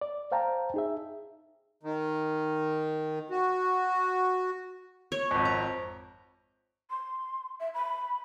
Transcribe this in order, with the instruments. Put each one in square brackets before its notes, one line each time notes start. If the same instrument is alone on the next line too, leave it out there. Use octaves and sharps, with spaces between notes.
[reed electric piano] D5
C5 F5 G5 A5 A#5
D#4 G#4 E5
[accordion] D#3
F#4
[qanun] C#5
[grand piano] G#1 F2
[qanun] A#5
[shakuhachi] C6
E5
B5